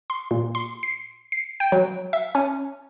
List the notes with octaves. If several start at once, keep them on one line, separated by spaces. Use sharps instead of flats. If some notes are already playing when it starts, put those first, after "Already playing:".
C6
A#2
C6
C7
C7
G5
F#3
E5
C#4